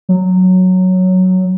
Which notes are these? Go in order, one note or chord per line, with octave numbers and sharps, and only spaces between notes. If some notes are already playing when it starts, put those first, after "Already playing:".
F#3